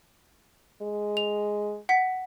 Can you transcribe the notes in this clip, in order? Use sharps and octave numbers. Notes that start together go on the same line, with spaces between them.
G#3
F7
F#5 B6